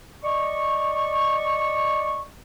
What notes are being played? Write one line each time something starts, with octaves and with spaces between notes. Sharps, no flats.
D5 D#5 C#6